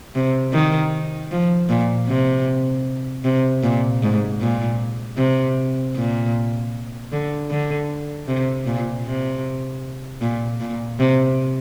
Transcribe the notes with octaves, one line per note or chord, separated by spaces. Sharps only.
C3
D#3
F3
A#2
C3
C3
A#2
G#2
A#2
C3
A#2
D3
D3
C3
A#2
C3
A#2
A#2
C3